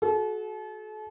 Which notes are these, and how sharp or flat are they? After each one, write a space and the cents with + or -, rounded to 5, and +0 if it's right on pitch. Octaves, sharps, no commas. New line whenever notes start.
F#4 +0 A4 -40